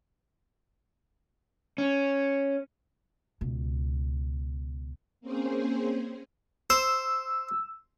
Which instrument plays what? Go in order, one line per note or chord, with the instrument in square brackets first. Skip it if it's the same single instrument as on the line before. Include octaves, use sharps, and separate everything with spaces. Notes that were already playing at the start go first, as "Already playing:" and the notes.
[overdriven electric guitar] C#4
[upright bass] C#2 B2
[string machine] A#3 C4 C#4 G#4 C5
[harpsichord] C5 [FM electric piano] E6